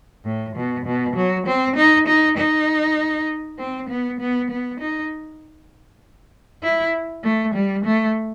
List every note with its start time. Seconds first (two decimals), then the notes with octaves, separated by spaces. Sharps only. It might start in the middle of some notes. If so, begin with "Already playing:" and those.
0.25 A2
0.56 B2
0.85 B2
1.16 F#3
1.47 C4
1.76 D#4
2.07 D#4
2.37 D#4
3.58 C4
3.89 B3
4.20 B3
4.50 B3
4.80 D#4
6.63 E4
7.23 A3
7.54 G3
7.85 A3